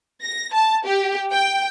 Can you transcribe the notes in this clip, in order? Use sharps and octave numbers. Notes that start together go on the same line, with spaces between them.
A#6
A5
G4
G5